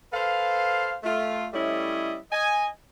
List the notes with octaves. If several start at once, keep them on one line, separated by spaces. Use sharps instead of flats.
A4 B4 C5 F5
A3 F4
G3 A3 C#4 E4 C#5 D#5
D#5 G#5